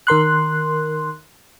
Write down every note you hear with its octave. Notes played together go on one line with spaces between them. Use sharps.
D#3 A#4 C6 F#6